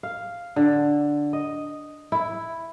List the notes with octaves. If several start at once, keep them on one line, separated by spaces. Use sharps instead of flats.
F5
D3
D#5
E4